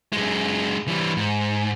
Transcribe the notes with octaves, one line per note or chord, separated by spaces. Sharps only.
F#2 G#3
E3 G3
G#2